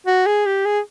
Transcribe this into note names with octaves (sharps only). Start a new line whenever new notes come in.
F#4
G#4
G4
G#4